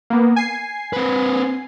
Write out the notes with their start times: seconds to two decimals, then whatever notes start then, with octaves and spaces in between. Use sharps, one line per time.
0.10 A#3 B3
0.36 G#5 C7
0.93 C4 B4